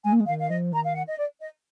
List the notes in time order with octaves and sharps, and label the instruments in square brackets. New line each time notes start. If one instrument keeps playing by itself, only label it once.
[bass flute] G#3 [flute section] G#5
[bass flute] A#3
G#3
[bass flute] D#3 [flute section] F5
[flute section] F5
[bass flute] F3 [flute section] D#5
[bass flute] D#3 [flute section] A#5
[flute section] F5
F#5
D#5
D5
D#5